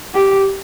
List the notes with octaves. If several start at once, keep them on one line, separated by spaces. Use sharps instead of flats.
G4